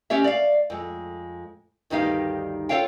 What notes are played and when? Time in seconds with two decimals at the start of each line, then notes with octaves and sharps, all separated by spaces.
0.10 G#3 C#4 G4 C#5 E5
0.24 D5 F5
0.70 F2 G#3
1.90 D2 G2 D#3 D#4 G4 F5
2.69 F4 F#4 A4 C#5 F5 G5